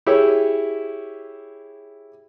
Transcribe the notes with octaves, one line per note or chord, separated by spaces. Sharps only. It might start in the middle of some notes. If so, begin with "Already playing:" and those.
E4 G4 G#4 C#5 E5